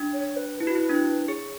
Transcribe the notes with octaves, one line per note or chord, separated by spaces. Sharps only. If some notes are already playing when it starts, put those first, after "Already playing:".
Already playing: D4
C#5
B4
E4 B4
F#4
E4
D4
E4
G#4 C#5